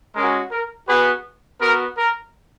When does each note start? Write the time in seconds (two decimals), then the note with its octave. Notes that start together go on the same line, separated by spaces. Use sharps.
0.15 G#3 C#4 F#4 A#4
0.52 A#4
0.88 B3 F#4 G#4 B4
1.61 B3 F#4 A#4
1.98 A#4